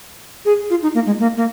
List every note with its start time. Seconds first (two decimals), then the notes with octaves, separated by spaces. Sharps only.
0.45 G#4
0.70 F4
0.82 D#4
0.95 A#3
1.06 G#3
1.20 A#3
1.37 A#3